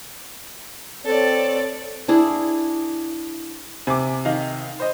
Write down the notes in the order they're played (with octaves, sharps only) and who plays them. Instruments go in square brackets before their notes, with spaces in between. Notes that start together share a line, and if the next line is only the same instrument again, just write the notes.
[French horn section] C4 C#5 [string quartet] A4 D5
[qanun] D4 E4 G#4
[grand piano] C3 [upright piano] G#5 D6
[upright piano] D#3 D#5 F5
[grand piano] C5 D#5